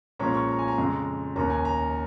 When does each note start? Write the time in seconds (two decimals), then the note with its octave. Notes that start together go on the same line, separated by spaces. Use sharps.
0.19 A#2 F3 G#3 C#4 A#5
0.34 C#6
0.49 A#5
0.59 G#5
0.68 A#5
0.78 F2 C#3 G#3
1.36 D#2 D#3 C#4 A#5
1.50 G#5
1.65 A#5